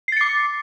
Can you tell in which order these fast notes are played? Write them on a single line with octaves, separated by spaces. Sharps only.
C7 A6 C#7 D6